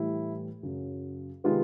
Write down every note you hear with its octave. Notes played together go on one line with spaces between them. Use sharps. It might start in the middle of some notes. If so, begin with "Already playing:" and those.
Already playing: A2 E3 G3 E4
F#2 C#3 F#3
C3 D#3 G#3 B3 F4